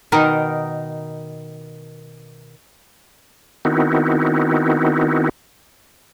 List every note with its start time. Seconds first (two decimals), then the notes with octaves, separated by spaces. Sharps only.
0.12 B2 D#3 D#4 A#4
3.65 D#3 B3 C4 D#4 E4 F#4